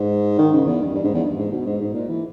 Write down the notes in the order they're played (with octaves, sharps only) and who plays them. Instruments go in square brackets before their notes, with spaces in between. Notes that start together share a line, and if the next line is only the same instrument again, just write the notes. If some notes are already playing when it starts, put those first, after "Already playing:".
Already playing: [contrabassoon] G#2
D#3
C#3
E2
G2
G2
G#2
E2
G2
G#2
B2
G#2
G#2
A#2
E3